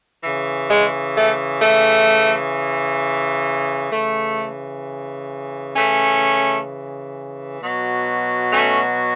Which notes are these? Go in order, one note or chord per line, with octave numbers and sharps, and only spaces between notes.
C#3 E3
G#3
A3
A3
C#3 E3 A3
A3 C#4
B2 F#3
A3 C#4